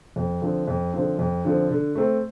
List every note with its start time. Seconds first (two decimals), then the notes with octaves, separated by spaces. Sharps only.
0.16 F2
0.42 D3 F3 C4
0.68 F2
0.94 D3 F3 C4
1.19 F2
1.45 D3 F3 C4
1.71 D3
1.95 A3 C4